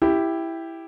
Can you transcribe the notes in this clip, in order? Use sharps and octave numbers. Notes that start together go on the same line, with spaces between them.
E4 G4